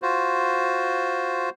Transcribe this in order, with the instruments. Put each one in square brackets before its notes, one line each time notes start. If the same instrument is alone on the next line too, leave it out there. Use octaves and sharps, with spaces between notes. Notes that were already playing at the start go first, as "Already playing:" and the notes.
[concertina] F4 F#4 C5